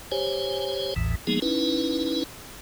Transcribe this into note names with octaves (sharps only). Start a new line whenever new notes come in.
G4 C5 C#5 G#5
A1 D#2 A2 E3
F3 G#3 A#3 B3 D#4 G#4
C#4 D#4 E4 B4